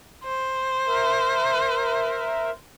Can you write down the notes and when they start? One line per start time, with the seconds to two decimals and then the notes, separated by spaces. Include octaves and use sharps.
0.24 C5
0.88 A#4 E5